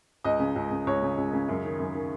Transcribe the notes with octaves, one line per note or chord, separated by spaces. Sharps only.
C#2 D#5
C#3
C#2
C#3
C#2 C#5
C#3
C#2
C#3
F#2
D#3
F#2
D#3